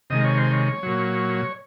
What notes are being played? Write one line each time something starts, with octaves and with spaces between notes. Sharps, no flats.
C3 D#3 G#3 D#5
C#5
C5
C#5
A#2 F#3